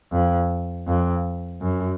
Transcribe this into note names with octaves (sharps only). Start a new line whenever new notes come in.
F2
F2
F#2